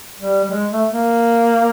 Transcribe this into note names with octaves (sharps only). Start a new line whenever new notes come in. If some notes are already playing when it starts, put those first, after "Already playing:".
G3
G3
G#3
A3
A#3